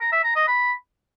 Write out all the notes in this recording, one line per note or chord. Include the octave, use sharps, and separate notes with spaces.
A#5
E5
A#5
D#5
B5